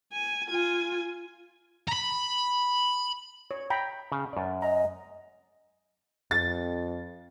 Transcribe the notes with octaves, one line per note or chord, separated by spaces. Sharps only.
G#5
F4 G#5
A#5 B5
C#5
G5 A#5 B5
C#3
F#2 D5
D#5 A#5
F2 A6